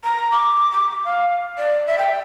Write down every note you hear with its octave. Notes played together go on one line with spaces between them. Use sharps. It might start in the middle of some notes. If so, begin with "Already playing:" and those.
A#5
D6
D6
F5
D5
E5
G5